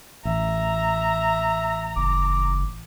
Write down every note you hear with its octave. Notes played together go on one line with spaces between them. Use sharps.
A1 E5 A#5
F#1 D6